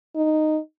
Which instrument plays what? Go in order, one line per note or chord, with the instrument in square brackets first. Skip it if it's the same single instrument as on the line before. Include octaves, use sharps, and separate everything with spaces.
[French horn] D#4